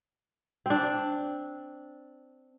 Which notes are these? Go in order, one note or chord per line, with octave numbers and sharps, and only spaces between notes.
C4 D4